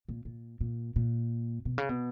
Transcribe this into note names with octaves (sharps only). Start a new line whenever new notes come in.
A#2
A#2
A#2
A#2
B2
C#3
B2